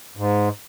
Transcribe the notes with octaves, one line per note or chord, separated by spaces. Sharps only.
G#2